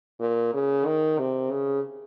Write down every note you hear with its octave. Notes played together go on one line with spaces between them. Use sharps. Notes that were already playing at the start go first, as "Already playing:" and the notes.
A#2
C#3
D#3
C3
C#3